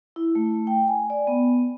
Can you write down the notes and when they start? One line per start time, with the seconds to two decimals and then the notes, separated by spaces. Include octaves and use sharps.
0.16 E4
0.35 A3
0.67 G5
0.88 G#5
1.10 D5
1.27 B3